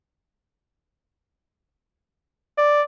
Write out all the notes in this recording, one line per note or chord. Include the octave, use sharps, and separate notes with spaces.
D5